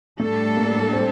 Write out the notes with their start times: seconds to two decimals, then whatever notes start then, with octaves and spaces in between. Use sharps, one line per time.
0.20 A2 G3 A3 D4 A4
0.57 A#3
0.93 C4